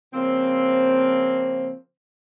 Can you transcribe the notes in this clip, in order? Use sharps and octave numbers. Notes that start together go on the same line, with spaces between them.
C#3 F3 A#3 C4